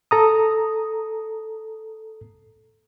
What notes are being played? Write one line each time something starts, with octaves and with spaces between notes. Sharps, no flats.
A4 A#5 D#6